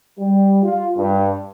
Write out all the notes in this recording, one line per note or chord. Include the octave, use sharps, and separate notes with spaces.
G3
F4
G2